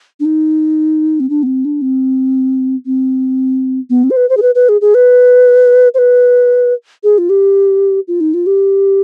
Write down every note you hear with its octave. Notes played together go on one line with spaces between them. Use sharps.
D4
D#4
C4
D4
B3
C4
D4
C4
C4
B3
C4
C5
B4
C5
G#4
B4
B4
G#4
G#4
B4
C5
B4
G#4
F4
G4
F4
D#4
F4
G4